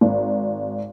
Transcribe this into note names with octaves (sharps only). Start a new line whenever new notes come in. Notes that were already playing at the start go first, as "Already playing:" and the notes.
G#1